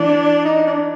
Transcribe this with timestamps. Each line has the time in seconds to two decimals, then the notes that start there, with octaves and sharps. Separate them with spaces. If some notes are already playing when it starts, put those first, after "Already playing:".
Already playing: E3 D4
0.45 D#4
0.67 D4